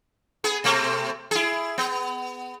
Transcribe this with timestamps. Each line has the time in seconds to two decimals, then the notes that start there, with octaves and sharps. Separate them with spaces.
0.44 B3 G#4
0.64 B2 A3 C4
1.31 E4 G#4
1.78 B3